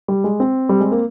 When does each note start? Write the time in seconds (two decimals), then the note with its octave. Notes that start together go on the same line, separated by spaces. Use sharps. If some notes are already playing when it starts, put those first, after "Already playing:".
0.08 G3
0.24 G#3
0.40 C4
0.69 G3
0.81 G#3
0.91 A#3